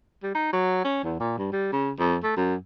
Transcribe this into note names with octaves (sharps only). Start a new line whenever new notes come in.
G3
D#4
F#3
C#4
E2
A#2
G2
G3
C#3
F2
A3
F#2